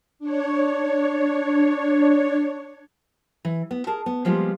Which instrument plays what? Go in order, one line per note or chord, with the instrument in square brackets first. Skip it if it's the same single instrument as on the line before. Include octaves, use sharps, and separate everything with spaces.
[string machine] D4 C#5
[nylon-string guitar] E3
B3
G#4 A#4 A5
B3
F3 G3 G#3 A#3 B3 F4